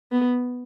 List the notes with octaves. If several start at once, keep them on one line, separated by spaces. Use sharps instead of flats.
B3